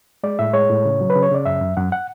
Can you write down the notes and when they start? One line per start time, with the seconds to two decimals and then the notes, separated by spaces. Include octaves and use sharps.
0.23 G#3 D5
0.39 A2 E5
0.54 G#3 C#5
0.70 A2
0.85 C#3
1.01 F#3
1.10 B4
1.15 C#3
1.23 C#5
1.31 C#3 D5
1.46 F#2 E5
1.61 F#2
1.77 F#2 F#5
1.92 F#5